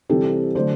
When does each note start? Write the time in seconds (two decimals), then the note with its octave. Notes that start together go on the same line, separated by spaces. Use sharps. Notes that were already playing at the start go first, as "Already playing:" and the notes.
0.09 C3 E3 G3 G4 A4
0.55 D3 F#3 A3 C5 D5